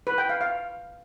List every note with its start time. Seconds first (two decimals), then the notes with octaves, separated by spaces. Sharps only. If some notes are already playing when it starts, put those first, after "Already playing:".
0.07 B4
0.18 G5
0.29 F5
0.41 F5